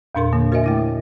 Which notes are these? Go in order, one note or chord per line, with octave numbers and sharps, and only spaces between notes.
E2 A#2 D4 A#4 C6
D3 A#3
F#4 A#4 C5 D#5 E5 G#5
A3 E4 A#6
D3